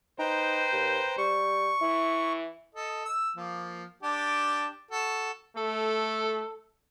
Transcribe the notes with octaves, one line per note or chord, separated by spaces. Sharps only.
D#4 B4 C5 G5 A#5
D#2
G3 C#6
E3 E4
A4 D#5
E6
F3 A#3
D4 G4 A5
F#4 A4
A3 A4